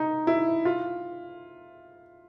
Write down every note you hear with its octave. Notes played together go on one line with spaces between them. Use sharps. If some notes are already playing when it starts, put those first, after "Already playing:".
Already playing: D#4
E4
F4